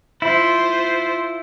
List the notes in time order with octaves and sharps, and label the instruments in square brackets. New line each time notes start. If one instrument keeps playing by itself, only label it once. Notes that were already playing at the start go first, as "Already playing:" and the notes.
[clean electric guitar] E4 [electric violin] F4 C5